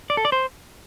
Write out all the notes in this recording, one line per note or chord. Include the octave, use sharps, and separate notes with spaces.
D5
A4
D5
C5